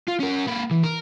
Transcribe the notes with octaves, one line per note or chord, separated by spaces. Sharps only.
F4
C#4 A#4
A#3 B4
E3
A#4